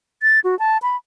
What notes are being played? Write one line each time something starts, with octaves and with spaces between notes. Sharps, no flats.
A6
F#4
A5
B5